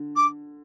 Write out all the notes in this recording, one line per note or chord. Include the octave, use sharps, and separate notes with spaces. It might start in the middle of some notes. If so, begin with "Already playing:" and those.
Already playing: D3
D6